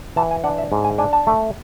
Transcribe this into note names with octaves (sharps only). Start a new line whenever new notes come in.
E3 A5
G#5
D4 F#5
E5
G#2
G#5
D4 G#5
A5
A3